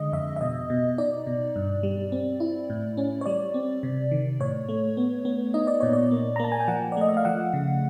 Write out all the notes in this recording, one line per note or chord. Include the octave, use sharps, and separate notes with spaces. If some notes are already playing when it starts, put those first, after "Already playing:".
Already playing: D3 G#3 D#5
F2 E5
E5
B2 D#5
B2
D#4 D5
B2
G2
G3
C4
E4
A2
C#4
C#5
G3 D5
C4
C3
D#3
A2 C#5
A3
B3
B3
D#4 D#5
D5
A#2 C#5
D5
A#3
A#5
A#3 A5
G#5
G5
F3 F#5
D5
A3 D#5
E5
F5
F3 F#5
C#3